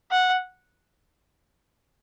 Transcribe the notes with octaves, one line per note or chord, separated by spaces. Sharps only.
F#5